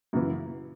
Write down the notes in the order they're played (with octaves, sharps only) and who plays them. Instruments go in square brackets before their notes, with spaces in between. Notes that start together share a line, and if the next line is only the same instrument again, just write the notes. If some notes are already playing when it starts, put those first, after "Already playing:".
[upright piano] F#2 C#3 E3